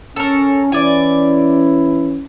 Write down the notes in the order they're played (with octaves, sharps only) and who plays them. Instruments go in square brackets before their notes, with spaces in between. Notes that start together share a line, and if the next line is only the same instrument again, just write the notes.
[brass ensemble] C#4 [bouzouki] A4 A#4
[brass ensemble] E3 C#4 E4 [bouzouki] D5 G#5